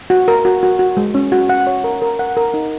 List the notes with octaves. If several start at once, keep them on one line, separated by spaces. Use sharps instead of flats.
F#4
A#4
F#4
F#4
F#4
G#3
C#4
F#4
F#5
C#5
A#4
A#4
F#5
A#4
D#4